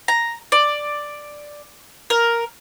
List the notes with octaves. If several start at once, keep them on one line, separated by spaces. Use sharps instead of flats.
A#5
D5
A#4